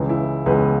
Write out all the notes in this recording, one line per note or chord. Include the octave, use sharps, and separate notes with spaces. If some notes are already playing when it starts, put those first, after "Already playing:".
Already playing: C#2 C#3 E3
E4
C#2 C#3 E3 B3 B4